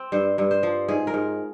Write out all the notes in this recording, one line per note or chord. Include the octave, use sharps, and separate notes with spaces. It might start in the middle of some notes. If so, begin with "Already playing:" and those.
Already playing: C4
G2 C5
G2
C5
F3
G#2 G#4
A#4
G#2